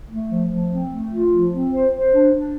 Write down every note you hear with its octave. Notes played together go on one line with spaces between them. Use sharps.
A3
F3
F3
C4
A3
F4
F3
C4
C5
C5
D4
D4